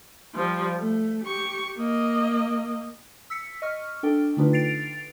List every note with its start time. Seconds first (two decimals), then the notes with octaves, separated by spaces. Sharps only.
0.34 F3 G3
0.79 A3
1.25 G4 C#6
1.77 A#3 D#5
3.30 E6 B6 C#7
3.62 D#5 C#6 F6
4.03 D4 A4 G5
4.37 D3 A3 D4 D#4 F4 B4
4.53 A6 C7 D7 F7